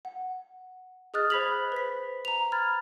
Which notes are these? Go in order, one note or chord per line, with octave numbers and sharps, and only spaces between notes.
F#5
G#4 D#5 D#6 F6 F#6 A6
C5 B5 G#6 B6 F7 F#7
B4 C5 B6
A#5 F7
B5 F6 G#6 A6